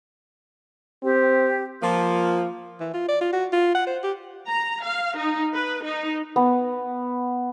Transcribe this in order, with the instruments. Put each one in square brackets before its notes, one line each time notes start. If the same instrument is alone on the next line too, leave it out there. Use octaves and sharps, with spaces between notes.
[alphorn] C4 [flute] G4
[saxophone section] F3 A#3
[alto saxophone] E3
F4
D5
F4
F#4
F4
F#5
C5
G4
[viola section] A#5
F5
D#4
B4
D#4
[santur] B3